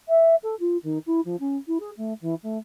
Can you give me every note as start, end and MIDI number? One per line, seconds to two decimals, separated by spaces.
0.08 0.35 76
0.43 0.55 69
0.60 0.77 65
0.83 0.98 51
1.06 1.20 64
1.25 1.36 53
1.40 1.56 61
1.67 1.77 64
1.80 1.90 68
1.97 2.13 57
2.21 2.34 52
2.43 2.57 57